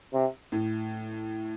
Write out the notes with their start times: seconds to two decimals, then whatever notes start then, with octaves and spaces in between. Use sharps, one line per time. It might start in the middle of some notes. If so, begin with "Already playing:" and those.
0.14 C3
0.52 A2